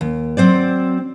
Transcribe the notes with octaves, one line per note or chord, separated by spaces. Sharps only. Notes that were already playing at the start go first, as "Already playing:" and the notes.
D#2
F#3 C4 C5 D5